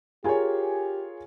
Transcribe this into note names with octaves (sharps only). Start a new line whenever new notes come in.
F4 G4 G#4 A#4 C#5 G#5